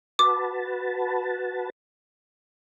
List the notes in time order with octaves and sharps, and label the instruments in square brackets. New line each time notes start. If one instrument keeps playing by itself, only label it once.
[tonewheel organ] F#4 B4 A5 [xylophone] D6